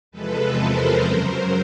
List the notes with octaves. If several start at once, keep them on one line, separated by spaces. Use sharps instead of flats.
E2 C3 F3 G#3 A4 B4
A#4 C5
F#2 C#3 F#3 A#4 C5